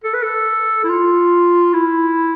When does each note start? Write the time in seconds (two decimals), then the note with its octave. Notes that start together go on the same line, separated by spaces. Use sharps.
0.04 A4
0.14 B4
0.23 A4
0.84 E4
0.89 F4
1.74 E4